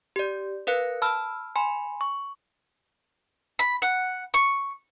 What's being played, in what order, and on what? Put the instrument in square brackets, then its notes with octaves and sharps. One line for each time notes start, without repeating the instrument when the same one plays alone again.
[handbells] G4 D5
A#4 B4 F5 F#6 C#7
A5 B5 E6 F6
G#5 B5 C6
C#6
[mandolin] B5
F#5
C#6